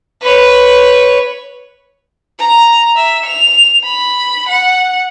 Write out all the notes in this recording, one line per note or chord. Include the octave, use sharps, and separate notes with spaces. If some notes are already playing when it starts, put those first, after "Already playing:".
B4 C#5
A#5
E5
F7
B5
F#5